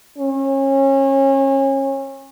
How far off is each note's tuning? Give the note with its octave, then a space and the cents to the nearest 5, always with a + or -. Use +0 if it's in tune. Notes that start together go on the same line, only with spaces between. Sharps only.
C#4 -30